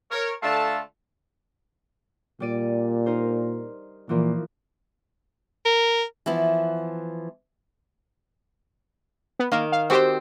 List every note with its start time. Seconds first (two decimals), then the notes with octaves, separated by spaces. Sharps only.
0.11 A#4 C#5
0.43 D3 A3 F4 A5
2.40 A#2 G3 D5 D#7
3.06 D#4 A#4 C5
4.09 A#2 E3 F3 A#3
5.66 A#4
6.26 E3 F3 B3 E4
9.39 B3
9.52 D#3 A#3
9.72 F5
9.90 C4 F#4 G4 C5